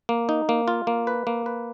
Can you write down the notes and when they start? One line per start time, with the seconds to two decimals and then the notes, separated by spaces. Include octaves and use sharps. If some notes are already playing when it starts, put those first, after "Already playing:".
0.09 A#3
0.29 D#4
0.49 A#3
0.68 F4
0.87 A#3
1.07 B4
1.27 A#3
1.46 B4